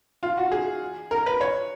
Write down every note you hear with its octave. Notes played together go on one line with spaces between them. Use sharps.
F4
F#4
G#4
A#4
B4
C#5